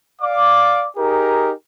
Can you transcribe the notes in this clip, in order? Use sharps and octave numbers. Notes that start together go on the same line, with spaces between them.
D5 F5 D6
D#4 G4 G#4 A#4